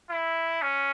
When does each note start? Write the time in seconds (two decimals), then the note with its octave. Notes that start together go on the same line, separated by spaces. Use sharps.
0.10 E4
0.62 C#4